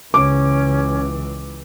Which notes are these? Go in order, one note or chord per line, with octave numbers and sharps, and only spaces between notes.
C#2 C#3 E3 C#4 D6